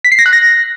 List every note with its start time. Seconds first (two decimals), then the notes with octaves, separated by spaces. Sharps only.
0.05 B6
0.12 C7
0.19 A#6
0.26 F#6
0.33 A#6